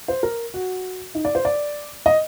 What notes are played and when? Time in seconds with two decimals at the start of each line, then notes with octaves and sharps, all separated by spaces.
0.08 C5
0.23 A#4
0.54 F#4
1.15 D#4
1.25 D5
1.35 C5
1.45 D5
2.06 D#5